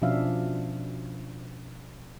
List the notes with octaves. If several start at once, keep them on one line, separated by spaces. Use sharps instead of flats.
B2 F3 C#4 D4 E5 F5